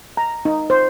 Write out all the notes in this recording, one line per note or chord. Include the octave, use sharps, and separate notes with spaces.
A#5
D#4
C5